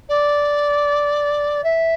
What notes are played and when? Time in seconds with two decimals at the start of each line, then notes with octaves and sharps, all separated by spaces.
0.09 D5
1.64 E5